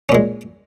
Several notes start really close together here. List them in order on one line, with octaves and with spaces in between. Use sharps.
C#4 A#2 G#3